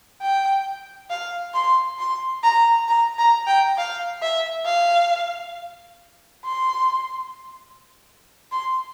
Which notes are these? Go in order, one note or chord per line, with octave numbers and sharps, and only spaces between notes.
G5
F5
C6
C6
A#5
A#5
A#5
G5
F5
E5
F5
C6
C6